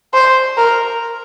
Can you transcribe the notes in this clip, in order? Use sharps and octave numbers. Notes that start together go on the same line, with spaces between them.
C5
A#4